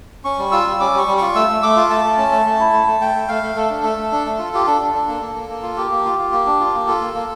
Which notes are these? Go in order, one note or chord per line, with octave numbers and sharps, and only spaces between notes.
C#4 C#6
G3
F4 E6
G3
C#4 D6
G3 C#6
G3
F4 C#6
A3 E6
A3
A3 D6
F4
A3 A5
A3
C#4
A3
A3
E4
A3
A3
A3 G5
A3
A3 F5
A3
A3 A4
D4
A3
A3
D4
A3
F4
F4 G4
D4 A4
D4
D4
A#3
A#3
A#3
A#3
F4
A#3 G4
A#3
F4
F4
A#3
D4
F4
A#3
F4 A4
A#3
A#3